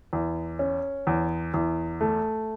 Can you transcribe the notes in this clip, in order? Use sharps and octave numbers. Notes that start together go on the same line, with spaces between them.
E2
C#4
E2
E2
A3